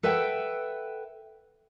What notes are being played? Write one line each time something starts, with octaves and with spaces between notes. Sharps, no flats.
A4 B4 E5 F#5 G5